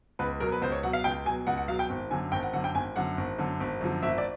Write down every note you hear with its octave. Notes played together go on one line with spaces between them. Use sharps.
C#2 B4
B2 F#3 A#4
B4
C#2 C5
C#5
B2 F#3 F#5
F5
C#2 G5
B2 F#3 G#5
C#2 F#5
F#5
B2 F#3 F5
G5
G#1
F#2 D3 G#5
G#1 G5
F#5
F#2 D3 F#5
G5
G#1 G#5
F#2 D3 F#5
G#1
F#2 D3
G#1
F#2 D3 F3
G#1 E5
D5